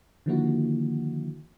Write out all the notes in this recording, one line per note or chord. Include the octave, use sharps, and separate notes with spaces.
D3 D#3 F3 A#3 E4 F#4